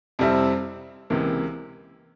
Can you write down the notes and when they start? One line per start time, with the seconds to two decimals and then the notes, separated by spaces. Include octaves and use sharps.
0.19 F2 C3 G3 C4 E4
1.10 C#2 C3 E3 A#3